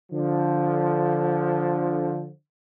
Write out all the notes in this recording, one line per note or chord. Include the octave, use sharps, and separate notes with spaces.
D3 F3